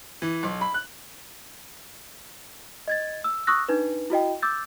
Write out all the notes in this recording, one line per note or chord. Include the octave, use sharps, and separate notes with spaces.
E3
B1
B5
F#6
D#5 G#6 A6
E6
C#6 D#6 E6 F#6 A#6
D4 D#4 B4
E4 F#4 D#5 G5
D6 E6 G6 A6